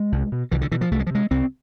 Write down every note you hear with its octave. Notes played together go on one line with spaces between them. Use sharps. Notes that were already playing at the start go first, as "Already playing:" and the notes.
Already playing: G#3
C2
B2
C2 E3
D3
B2 E3
F3
C2 A3
G#3
F3
C3 G#3
C2 C4